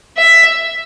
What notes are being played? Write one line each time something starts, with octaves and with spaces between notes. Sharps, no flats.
E5